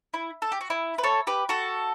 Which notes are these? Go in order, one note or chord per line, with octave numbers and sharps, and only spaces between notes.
E4
A4
G4
F#4
E4
B4
A4 C#5
G4 B4
F#4 A4